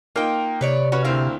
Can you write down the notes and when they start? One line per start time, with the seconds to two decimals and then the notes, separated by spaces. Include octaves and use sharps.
0.16 A#3 D#4 F4 A#4 G5
0.61 C3 B4 C#5 D5
0.92 C#4 F#4 B4 C#5
1.05 D2 A#3 C4 E4 F5